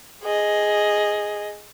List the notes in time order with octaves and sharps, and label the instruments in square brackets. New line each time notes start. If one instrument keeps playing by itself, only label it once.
[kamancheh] G#4 D#5